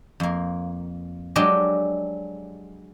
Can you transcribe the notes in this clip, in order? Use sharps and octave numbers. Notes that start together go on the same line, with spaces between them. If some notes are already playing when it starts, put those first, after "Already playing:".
F2 A#3
F#3 G#3 D4 G4 A4 D#5